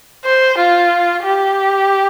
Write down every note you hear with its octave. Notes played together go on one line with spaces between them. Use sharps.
C5
F4
G4